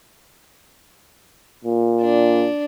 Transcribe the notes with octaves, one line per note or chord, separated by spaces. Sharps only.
A#2
D4